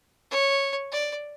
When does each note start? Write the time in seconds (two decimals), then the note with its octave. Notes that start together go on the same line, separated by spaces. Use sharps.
0.31 C#5
0.92 D5